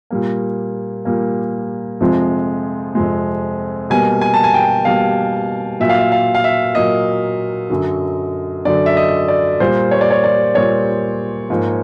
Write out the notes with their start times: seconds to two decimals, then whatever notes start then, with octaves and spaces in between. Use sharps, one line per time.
0.10 A#2 G3 A#3
1.05 A#2 G3 A#3
2.00 F2 C3 F3 G#3
2.95 F2 C3 F3 G#3
3.90 B2 G3 A#3 G#5
4.21 G#5
4.34 A5
4.44 G#5
4.54 G5
4.85 B2 G3 A#3 F5
5.80 A#2 F#3 A#3 E5
5.89 F5
5.99 E5
6.12 F5
6.35 F5
6.44 E5
6.75 A#2 F#3 A#3 D#5
7.70 F#2 D3 F#3
8.65 F#2 D3 F#3 D5
8.86 E5
8.97 D#5
9.28 D5
9.60 A#2 G3 A#3 C5
9.91 C#5
10.01 D5
10.10 C#5
10.24 D5
10.55 A#2 G3 A#3 C#5
11.50 G#2 F3 A#3